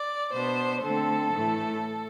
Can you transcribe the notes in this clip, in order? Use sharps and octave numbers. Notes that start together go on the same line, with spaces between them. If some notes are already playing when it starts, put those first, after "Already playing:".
Already playing: D5
B2 B3 D4 C5
D3 A3 C4 A4
A2 E3 A3